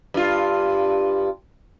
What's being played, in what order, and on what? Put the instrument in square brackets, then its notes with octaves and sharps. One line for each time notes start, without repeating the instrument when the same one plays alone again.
[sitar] G2 F4